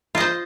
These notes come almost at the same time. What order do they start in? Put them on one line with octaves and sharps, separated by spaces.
F4 D#5 C5